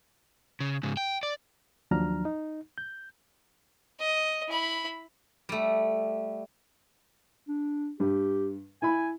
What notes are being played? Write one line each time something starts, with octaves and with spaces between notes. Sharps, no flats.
C#3
G#2 C#3
G5
D5
D#2 F3 F#3 D4 A#5 F6
D#4
G6
D#5
E4 B5
G3 A3
D4
G2 G4
E4 G#5 B5